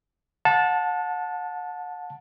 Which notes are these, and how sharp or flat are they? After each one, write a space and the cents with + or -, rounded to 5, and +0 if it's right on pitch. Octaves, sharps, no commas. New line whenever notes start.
F#5 -35 A5 -5